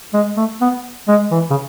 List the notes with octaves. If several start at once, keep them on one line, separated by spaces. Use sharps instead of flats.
G#3
A3
B3
G#3
E3
C#3